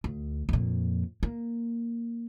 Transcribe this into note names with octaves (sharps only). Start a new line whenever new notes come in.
D2
F2 A#2
A#3